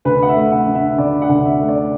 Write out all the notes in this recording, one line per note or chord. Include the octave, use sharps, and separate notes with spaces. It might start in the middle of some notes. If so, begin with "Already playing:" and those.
D2 B4
F#5
E5
A3
F#5
D3
E5
D2 D5
F#5
D2
E5
A3
D5